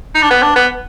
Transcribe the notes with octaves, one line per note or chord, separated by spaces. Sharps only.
D#4
D4
B3
D4
B3